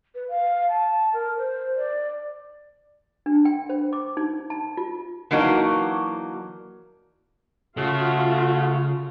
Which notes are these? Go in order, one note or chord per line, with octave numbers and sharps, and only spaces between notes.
B4
F5
A5
A#4
C5
D5
D4
G5
C5
D6
D#4
A5
F4
E3 F#3 A#3 D4 D#4 F#4
C#3 A3 F4 F#4